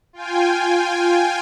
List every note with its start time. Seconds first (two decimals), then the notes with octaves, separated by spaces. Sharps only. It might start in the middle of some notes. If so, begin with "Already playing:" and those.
0.13 F4 G5 G#5